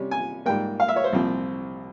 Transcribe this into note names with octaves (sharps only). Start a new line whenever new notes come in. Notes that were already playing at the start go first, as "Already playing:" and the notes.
Already playing: C3 G3 C#4
G#5
G#2 G3 A#3 G5
F5
E5
C#5
C5
C2 A#2 F3 C4